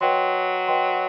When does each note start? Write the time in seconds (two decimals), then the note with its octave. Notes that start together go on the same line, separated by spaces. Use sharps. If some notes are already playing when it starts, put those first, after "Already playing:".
0.01 F#3 B4 D#5 G5 C6
0.68 B4 D#5 G5 C6